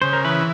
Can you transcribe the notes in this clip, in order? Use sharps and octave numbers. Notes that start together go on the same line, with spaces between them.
C#3 C5
A#4
E3 B4